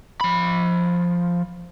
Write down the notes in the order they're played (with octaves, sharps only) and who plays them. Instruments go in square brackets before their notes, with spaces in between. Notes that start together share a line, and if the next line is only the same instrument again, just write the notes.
[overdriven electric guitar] F3 B5